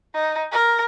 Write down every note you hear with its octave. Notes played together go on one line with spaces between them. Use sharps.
D#4
A#4